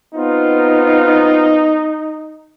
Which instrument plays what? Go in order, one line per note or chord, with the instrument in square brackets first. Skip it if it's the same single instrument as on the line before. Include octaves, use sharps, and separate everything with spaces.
[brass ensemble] B3 C4 F4 [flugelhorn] D#4